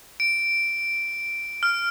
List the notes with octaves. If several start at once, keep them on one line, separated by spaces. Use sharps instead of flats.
D7
F6